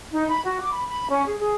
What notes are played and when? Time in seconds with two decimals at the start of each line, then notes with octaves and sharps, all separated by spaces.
0.12 D#4
0.29 B5
0.44 F#4
0.60 D6
0.71 B5
0.89 B5
1.08 C#4
1.26 G#4
1.38 G#4